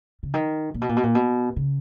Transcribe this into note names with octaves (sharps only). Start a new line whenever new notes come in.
C#3
D#3
A#2
B2
A#2
B2
A#2
B2
C#3